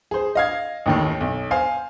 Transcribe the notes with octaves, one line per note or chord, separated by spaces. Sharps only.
G#4 C5
D#5 F5 G#6
A1 D#2 D#3
B1
C5 F5 G#5